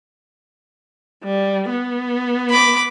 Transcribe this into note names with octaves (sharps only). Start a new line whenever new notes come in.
G3
B3
B5 D6